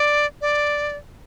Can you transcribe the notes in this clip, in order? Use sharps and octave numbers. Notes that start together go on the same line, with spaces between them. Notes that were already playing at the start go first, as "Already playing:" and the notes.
Already playing: D5
D5